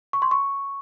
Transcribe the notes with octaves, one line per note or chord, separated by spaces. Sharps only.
C#6
C6
C#6